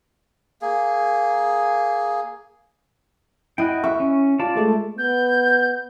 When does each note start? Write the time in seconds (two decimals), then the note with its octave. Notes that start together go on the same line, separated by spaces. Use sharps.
0.62 A#3 G#4
3.58 E4 F#4 D#5 G5
3.84 E5 C#6
4.00 C#4
4.39 F4 D5 A5
4.55 G#3 A3
4.98 B3 G6